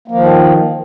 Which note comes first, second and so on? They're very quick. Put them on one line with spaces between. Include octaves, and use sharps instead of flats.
A#3 F3 D#3